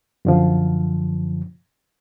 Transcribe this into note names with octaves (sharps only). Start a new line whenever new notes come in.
F#2 D3 F3